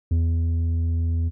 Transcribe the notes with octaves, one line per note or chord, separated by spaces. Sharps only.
E2